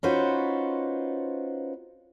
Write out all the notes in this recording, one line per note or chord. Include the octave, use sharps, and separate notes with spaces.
C#4 D#4 F4 F#4 B4 C5